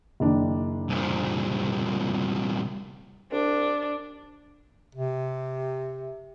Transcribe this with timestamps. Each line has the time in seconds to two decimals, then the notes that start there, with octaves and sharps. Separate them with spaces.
0.20 F#1 D#3 D4
0.89 C2 A#2
3.32 C2 D4
4.95 C3